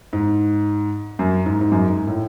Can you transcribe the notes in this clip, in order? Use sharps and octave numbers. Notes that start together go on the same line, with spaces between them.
G#2
F#2
G#2
G#2
F#2
G#2
A2